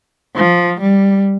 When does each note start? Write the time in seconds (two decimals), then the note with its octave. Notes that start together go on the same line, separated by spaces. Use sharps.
0.36 F3
0.80 G3